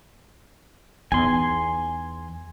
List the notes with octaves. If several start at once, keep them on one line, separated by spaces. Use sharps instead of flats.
E2 D#4 G#5 C6